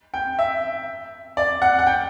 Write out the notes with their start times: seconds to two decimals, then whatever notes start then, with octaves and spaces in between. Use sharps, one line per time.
0.14 G5
0.39 E5
1.37 D5
1.62 F#5
1.79 F#5
1.87 G5